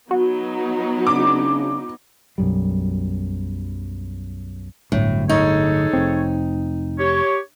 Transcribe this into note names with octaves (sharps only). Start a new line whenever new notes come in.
F#3 B3 D#4 F#4
C#3 D4 D6
B1 F#2 G3
D1 G1 D2 A2
D#4 G#4 A4 C#5
F1 C4
G4 C#5